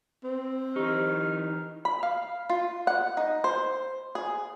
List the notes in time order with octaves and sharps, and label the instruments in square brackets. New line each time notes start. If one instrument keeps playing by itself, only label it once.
[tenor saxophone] C4
[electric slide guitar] E3 D#4 [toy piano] G4 [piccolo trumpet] F6
[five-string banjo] B5
F5
F4
F#5
D#4
C5
G#4